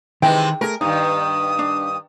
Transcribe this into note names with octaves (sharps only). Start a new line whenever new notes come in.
C3 D#3 E3 G#3 B4 G5
A3 G#4 A#4
G2 D#3 D#4 D#6
D4